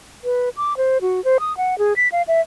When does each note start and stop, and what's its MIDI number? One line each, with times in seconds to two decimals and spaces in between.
0.24 0.49 71
0.57 0.77 86
0.77 0.98 72
1.01 1.23 66
1.25 1.38 72
1.40 1.56 87
1.57 1.78 78
1.78 1.93 68
1.96 2.08 95
2.12 2.22 77
2.28 2.41 76